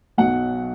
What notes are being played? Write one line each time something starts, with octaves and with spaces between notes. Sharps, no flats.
B1 B2 F#3 F#5